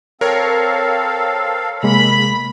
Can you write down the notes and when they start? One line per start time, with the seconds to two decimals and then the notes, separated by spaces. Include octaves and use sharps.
0.21 C4 A4 A#4 C#5 F5 F6
1.83 C3 G#3 A#3 B5